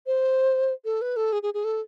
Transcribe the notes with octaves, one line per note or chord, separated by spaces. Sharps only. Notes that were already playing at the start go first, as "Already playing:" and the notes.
C5
A4
B4
A4
G#4
G#4
G#4
A4